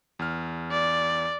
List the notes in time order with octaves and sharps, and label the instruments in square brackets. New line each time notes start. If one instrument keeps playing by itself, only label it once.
[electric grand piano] E2 F6
[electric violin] D5